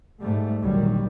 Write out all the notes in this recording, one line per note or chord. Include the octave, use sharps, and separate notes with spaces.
G#2 G3 A3
A1 D2 A#2 D#3 F#3 G3